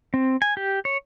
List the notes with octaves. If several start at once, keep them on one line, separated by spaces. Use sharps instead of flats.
C4
G#5
G4
C#5